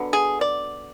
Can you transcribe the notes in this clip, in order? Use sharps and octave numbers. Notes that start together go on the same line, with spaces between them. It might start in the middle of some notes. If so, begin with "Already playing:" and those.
Already playing: D3 F#3 B3
G#4
D5